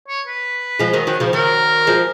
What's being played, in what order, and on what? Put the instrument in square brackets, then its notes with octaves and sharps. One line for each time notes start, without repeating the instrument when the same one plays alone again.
[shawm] C#5
B4
[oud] F3 G#3
D#3 F#3
D#3 F#3
C#3 F3
[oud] D#3 F#3 [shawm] A#4
[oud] F3 G#3